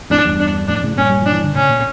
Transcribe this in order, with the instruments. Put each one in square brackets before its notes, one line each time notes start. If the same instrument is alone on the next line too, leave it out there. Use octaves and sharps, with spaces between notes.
[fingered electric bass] F2 A2 [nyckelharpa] D4
[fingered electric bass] E2 G2
[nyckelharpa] D4
[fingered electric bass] F2 A2 [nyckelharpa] D4
[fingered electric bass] A2 C#3
[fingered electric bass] G2 A#2 [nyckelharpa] C#4
[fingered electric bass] G3
[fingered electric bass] F3 [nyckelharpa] D4
[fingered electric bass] E3
D3
[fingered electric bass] A2 C#3 [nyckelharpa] C#4
[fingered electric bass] A#2